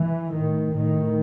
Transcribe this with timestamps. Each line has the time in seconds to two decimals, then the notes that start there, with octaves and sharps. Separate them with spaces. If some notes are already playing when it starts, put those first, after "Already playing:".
Already playing: E3
0.32 A2 D#3
0.73 A2 D#3